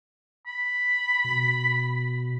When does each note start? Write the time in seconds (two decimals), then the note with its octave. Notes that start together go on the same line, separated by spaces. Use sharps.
0.47 B5
1.24 B2